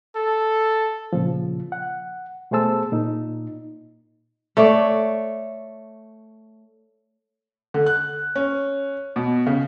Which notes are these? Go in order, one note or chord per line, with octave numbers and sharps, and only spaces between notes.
A4
A#2 C#3 F3
F#5
B2 A3 G#4 C5 A5 E6
A#2 D#4
A3 C#5 D5
D3
F#6
C#4
B2
C#3